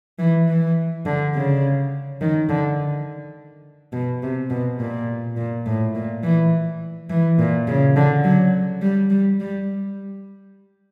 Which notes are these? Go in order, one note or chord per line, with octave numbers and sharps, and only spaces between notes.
E3
E3
D3
C#3
D#3
D3
B2
C3
B2
A#2
A#2
A2
A#2
E3
E3
A#2
C#3
D3
F#3
G3
G3
G3